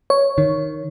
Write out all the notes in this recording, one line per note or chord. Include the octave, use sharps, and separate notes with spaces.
C#5
D#3